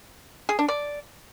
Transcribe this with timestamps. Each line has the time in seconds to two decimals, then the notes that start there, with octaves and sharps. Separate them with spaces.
0.49 G#4
0.59 D4
0.68 D5